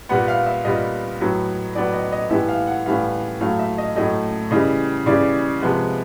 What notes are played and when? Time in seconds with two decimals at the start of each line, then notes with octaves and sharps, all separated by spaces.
0.09 A#2 G3 B3 F#5
0.28 F5
0.46 E5
0.65 A#2 G3 B3 D#5
1.20 A2 F#3 B3
1.75 A2 F#3 B3 D5
1.94 D#5
2.12 D#5
2.30 A2 E3 G3 B3 E5
2.49 F5
2.67 F#5
2.86 A2 E3 G3 B3 F5
3.41 A2 F#3 A3 F5
3.59 E5
3.78 D#5
3.96 A2 F#3 A3 D#5
4.51 C#3 E3 G3 D#5
5.06 C#3 E3 G3 D5
5.62 C3 F3 G#3 B3